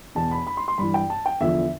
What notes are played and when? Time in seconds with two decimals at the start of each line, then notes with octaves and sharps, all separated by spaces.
0.15 E2 B2 A5
0.31 B5
0.47 B5
0.57 C6
0.68 C6
0.78 G2 E3 B5
0.94 G5
1.10 A5
1.26 G5
1.41 E2 D3 F3 E5